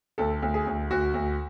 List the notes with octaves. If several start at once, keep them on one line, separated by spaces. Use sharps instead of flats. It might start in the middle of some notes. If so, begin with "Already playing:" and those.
D2 A4
D2
G#4
D2
D2 F#4
D2